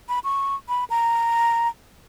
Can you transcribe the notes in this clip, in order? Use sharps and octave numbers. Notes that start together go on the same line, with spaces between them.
B5
C#6
B5
A#5